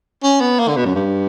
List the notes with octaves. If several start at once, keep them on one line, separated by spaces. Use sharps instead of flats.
C#4
B3
A#3
D3
B2
F#2
G2